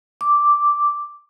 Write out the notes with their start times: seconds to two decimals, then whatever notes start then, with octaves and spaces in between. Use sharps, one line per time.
0.21 D6